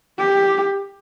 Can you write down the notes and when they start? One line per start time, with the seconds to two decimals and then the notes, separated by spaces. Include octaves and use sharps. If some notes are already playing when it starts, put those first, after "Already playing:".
0.19 G4